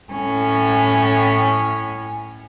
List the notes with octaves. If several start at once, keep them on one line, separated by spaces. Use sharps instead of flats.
A2 C#4